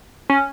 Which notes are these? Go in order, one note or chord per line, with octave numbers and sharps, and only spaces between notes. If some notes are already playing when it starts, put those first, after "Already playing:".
C#4